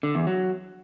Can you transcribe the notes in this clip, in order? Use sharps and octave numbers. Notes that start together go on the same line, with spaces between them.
D3
E2
F#3